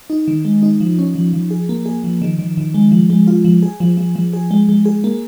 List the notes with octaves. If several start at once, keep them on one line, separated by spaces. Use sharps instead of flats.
D#4
D#3
G#3
D#4
F3
C#4
F3
F3
G#4
A#3
G#4
F3
D#3
D#3
D#3
G#3
F3
G#3
F4
F3
G#4
F3
F3
F3
G#4
G#3
G#3
G#4
A#3